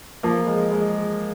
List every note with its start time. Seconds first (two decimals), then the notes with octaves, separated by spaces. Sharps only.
0.23 F3 A#3
0.47 G#3
0.72 G#3